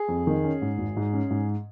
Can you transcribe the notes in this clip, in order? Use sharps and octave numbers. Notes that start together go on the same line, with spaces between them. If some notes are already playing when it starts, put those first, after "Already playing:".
Already playing: G#4
F2
D#3
C#4
G#2
G#1
G#2
C#4
G#2